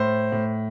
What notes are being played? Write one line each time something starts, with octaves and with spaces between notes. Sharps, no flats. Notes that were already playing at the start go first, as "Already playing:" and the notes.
Already playing: A2 C5
A2